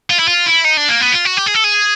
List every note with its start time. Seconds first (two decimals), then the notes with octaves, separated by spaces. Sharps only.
0.10 F4
0.19 E4
0.28 F4
0.46 E4
0.64 D#4
0.77 D4
0.89 A#3
1.01 B3
1.12 F4
1.25 F#4
1.37 G4
1.46 G#4
1.55 A4
1.64 G#4